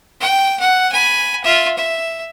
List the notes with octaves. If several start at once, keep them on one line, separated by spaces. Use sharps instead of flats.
G5
F#5
G#5 B5
F4 E5
E5